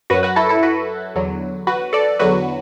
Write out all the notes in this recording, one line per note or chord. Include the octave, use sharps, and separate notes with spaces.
F#2 F#3 F#4 B4
F#4 B4
E4 A4
E4 A4
F#4 B4
E2 D3 F#3
F#4 B4
A4 D5
E2 D3 F#3 F#4 B4